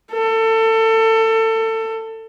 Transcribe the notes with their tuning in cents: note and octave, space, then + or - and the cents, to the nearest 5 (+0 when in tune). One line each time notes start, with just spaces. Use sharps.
A4 +25